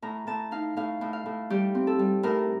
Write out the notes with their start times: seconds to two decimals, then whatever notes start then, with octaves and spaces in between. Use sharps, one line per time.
0.02 A2 A#5
0.27 A2 A5
0.51 D#4 F5
0.77 A2 F5
1.01 A2
1.13 F5
1.26 A2
1.50 G3 G4
1.75 C4
1.87 A4
1.99 G3
2.23 A2 A#4